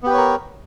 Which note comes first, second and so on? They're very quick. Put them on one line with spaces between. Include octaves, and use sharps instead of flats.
B3 G4 B4 C#5 A#4